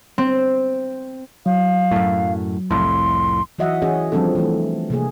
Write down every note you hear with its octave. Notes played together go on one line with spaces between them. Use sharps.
C4
F#3 F5
F#2 A2
C2 F2 A2 C6
E3 F#3 F#4 D#5 E5 F#5
E3 C#4 F#4 G#4 D#5
F3 G3 C4 D4 A4
E3 A3
C3 A#3 G#4